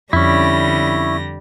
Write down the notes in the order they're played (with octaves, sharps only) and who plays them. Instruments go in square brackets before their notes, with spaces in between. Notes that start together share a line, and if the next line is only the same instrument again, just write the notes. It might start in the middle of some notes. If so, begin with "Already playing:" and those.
[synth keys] F2 [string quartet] D3 G3 A#6 [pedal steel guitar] C#4 E4